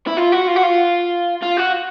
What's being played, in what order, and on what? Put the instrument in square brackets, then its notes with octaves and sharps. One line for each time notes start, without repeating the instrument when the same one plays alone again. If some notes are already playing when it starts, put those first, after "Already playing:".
[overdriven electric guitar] E4
F4
F#4
F4
F#4
F4
F4
F#4